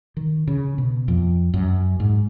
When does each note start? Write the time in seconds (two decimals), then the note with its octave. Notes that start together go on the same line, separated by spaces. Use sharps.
0.17 D#3
0.48 C#3
0.78 B2
1.08 F2
1.54 F#2
2.00 G#2